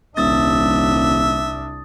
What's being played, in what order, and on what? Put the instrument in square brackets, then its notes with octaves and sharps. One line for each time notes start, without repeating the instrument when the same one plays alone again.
[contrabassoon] D#1 [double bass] C2 D4 [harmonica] E5 [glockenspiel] D#6 A6